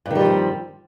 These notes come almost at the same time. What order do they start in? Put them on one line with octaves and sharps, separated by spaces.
G2 D#3 G3 F3 C4